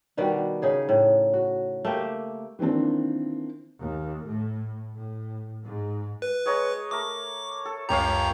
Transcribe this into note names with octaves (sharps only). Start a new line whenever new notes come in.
B2 D#3 G3 F#4
C#3 D#4 G#4
A2
F#4
A3 A#3 G4
D#3 E3 A#3 C4 D4
D#2
A2
A2
G#2
B4
G#3 C#5 A#5
A3 A#4 D6
A4
C#2 F#2 G4 C#5 F5 A#5